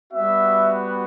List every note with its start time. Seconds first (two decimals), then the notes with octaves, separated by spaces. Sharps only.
0.13 G3 B3 F#4 E5